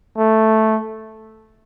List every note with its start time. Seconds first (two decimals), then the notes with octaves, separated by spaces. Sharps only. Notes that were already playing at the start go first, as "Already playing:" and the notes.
0.18 A3